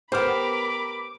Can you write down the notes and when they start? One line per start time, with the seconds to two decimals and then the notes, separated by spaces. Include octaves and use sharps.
0.12 B3 G4 A#4 C5 B5 D6 F6